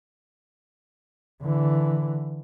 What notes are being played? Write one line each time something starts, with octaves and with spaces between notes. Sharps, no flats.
D3 E3